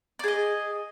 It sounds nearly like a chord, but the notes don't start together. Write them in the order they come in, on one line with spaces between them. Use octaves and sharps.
D5 G#4 D#5